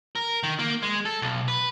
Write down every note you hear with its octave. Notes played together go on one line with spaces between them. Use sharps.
A#4
D#3
A#3
G#3
A4
B1
B4